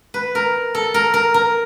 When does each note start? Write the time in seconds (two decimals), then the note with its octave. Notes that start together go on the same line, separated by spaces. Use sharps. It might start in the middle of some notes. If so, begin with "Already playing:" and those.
0.14 B4
0.35 A#4
0.75 A4
0.94 A#4
1.14 A#4
1.34 A#4